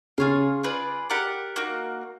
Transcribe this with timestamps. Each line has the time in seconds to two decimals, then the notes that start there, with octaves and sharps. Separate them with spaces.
0.18 C#3 F4 G#4 C#5 F5
0.63 F4 G#4 B4 D5
1.10 G4 A#4 D5 F#5
1.56 A#3 D#4 F#4